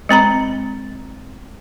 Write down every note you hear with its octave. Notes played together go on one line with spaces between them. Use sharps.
G#3 C4 A#5 B5